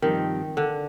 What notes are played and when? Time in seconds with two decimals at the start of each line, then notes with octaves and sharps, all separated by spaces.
0.02 G2 D#3 F3 C4 D#4 G4
0.57 D3